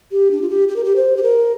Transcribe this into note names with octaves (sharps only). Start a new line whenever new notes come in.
G4
D4
F4
G4
G4
A#4
G4
C5
G4
A#4